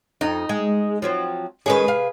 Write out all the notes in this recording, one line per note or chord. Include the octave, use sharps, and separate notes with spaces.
F2 D#4
G#3
F3 F#3 C4
D#3 G#3 C#4 G#4 B4
C3 F5